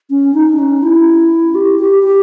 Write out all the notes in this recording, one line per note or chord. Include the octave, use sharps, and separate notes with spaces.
C#4
D#4
C#4
E4
G4
G4
G4